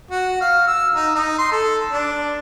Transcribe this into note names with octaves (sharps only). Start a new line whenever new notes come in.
F#4
F5
E6
D#4
D#4
C6
A4
D4